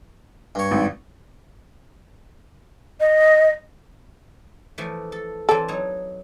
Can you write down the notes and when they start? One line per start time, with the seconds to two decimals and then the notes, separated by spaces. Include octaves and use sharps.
0.55 G2 C#5
0.71 G#1
3.00 D#5
4.78 E3 F3 A3
5.12 A4
5.49 E3 C4 A4 D5
5.68 F#3 D#4 C#5